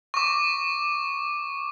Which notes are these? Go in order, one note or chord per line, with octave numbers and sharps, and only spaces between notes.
C#6 D6